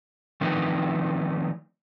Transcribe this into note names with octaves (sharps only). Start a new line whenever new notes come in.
D#3 F3 A3 C4 D#4 B4